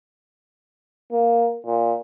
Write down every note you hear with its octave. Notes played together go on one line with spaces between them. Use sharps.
A#3
A#2